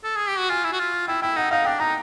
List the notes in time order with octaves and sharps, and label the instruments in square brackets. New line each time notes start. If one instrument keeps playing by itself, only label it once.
[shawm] A4
G#4
G4
F#4
[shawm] F4 [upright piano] G#5
[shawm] E4
F#4
F4
[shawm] E4 [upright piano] G5
[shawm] E4 [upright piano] G5
[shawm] D#4 [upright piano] F#5
[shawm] D#4 [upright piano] F5
[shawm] D4 [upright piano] G5
[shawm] D#4 [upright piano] A#5